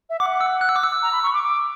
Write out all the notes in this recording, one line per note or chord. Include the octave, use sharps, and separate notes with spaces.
E5
F#5 D6
E6
F#6
E6
D6
E6
A#5
B5
C#6
D6
D6